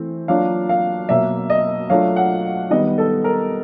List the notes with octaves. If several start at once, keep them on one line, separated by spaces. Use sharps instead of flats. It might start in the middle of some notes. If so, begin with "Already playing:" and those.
Already playing: E3 A3 C4
F#3 A#3 D4 F4 F5
F5
B2 F#3 A#3 E5
D#5
F#3 A3 D4 F4 F5
F#5
D#3 G3 B3 D#5
A4
A#4